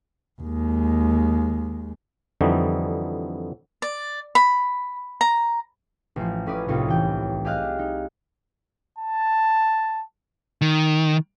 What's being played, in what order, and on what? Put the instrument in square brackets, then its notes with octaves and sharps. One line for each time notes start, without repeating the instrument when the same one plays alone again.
[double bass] D#2 G#3
[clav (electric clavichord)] F2 D3 E3 G3 D#4
[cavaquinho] D5
B5
A#5
[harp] A1 F3
A2 C#4 B4 D5 D#6
C2 A2 D#4 F4 C#5
E3 G5
G4 G#4 D#5 F5 F6 F#6
D#4
[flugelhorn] A5
[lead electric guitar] D#3